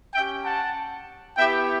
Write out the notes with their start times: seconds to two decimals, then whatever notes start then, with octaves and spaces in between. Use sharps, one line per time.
0.14 C#4 G4 E5 G5
0.45 F#5 A5
1.37 B3 E4 G4 E5 G5